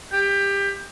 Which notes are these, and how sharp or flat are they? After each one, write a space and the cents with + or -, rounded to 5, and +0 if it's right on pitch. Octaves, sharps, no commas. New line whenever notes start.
G4 +20